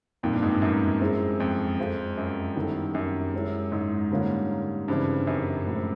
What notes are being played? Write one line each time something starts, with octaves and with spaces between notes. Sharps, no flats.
F2 A#2 G3 A#3 D#4 G4
G2
G#2
G2
F#2
G#3 C4 E4 G#4
F2
F3 G#3 C4 F4 A4
F#2
D#3 G3 B3 E4 A4
F#2
G#3 C#4 E4
G#2
D3 G3 A#3 C#4 F4
G2 C#3 E3 G3 C4 D#4
F#2
A2 F3 G#3